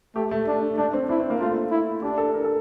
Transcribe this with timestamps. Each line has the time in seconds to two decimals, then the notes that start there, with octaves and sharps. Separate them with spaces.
0.15 A3 G4
0.31 A3
0.47 D4
0.78 A3 D4
0.93 C4
1.09 D4 E4
1.20 C4
1.30 A#3
1.40 A3 F4
1.71 E4
2.02 D4 G4
2.18 A4
2.34 A#4
2.44 A4